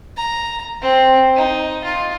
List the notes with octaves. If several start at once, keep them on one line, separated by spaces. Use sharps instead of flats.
A#5
C4
D#4
F4